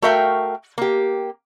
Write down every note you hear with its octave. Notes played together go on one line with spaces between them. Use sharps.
A3 F#4 A#4 E5 F5 G5
A#3 G4